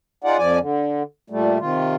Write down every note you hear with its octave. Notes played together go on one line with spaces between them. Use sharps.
D#4 F4 G#4 D5 F#5
F2 F3 D5 G#5
D3
A#2 G3 A3
C3 D#3 F4